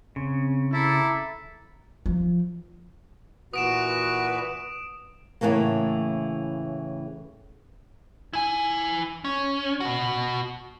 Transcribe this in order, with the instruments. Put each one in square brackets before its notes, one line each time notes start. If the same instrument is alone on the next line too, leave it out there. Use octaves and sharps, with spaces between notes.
[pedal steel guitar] C#3 [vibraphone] C4
[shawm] E4 [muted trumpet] A4 [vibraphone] E5 A#5 D6
[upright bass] F3
[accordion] A#2 E3 F#4 [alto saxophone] B4 [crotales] D#6 D7 E7
[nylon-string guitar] A2 C#3 E3 A3 A#3
[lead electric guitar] E4 G#5
C#4
B2 F#4